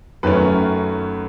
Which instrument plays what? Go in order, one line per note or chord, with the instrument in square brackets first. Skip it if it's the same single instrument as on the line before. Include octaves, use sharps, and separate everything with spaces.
[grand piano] F#2 D#3 A3 C#4 B4